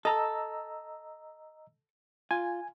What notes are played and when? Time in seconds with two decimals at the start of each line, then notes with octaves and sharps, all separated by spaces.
0.05 A4 D#5 A#5 E6
2.31 F4 G#5